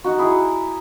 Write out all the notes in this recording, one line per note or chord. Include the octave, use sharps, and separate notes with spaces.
D#4 F#4
E4 G#4